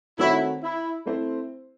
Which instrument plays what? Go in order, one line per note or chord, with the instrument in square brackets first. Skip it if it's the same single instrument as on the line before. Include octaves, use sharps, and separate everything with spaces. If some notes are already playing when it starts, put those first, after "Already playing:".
[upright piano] D#3 A3 C4 F#4 C#5 [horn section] E4
[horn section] E4
[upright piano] A3 C4 E4 C5